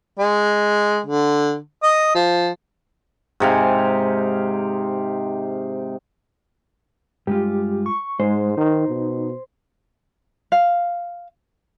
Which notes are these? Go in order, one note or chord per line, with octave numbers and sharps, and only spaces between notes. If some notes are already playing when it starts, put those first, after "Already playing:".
G#3
D3
D#5
F3
G#2 C3 F5
G2 G#3 F4 G4
C#6
G#2 G#3 C5
D#3 D#4
B2
F5